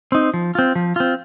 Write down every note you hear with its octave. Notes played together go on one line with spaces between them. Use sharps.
C4 D#4
F3
C4 F4
F3
C4 F4